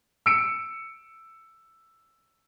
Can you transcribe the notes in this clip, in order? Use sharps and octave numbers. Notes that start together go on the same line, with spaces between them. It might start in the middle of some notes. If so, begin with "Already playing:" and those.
E6 C#7 D7